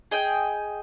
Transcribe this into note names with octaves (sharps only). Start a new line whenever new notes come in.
G#4 D#5 G5